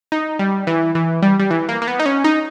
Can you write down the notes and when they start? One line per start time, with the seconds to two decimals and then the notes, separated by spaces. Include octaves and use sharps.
0.12 D#4
0.39 G3
0.67 E3
0.95 E3
1.22 G3
1.40 G3
1.51 E3
1.69 A#3
1.82 A#3
1.88 B3
2.00 D#4
2.06 C#4
2.24 D#4